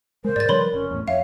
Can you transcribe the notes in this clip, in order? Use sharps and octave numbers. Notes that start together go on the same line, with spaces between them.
C#3 G#3 A#4 C5
G#2 D5 A6
C#3 F3 G3 B4 C#5 B5 C6
F1 C#4
E2 A2
F2 C#5 E5 F5